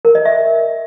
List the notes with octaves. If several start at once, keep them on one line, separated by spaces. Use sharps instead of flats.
A#4
D#5
E5